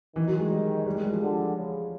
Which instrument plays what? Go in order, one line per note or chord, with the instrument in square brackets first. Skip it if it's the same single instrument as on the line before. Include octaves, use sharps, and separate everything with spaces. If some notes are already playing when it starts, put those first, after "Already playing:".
[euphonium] D#3 [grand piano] E3
[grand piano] F#3
G#3
G3
G3
G#3
G3
F3
[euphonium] D3
C#3